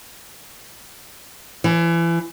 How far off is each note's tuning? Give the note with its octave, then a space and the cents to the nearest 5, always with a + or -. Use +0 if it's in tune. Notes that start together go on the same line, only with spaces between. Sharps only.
E3 +30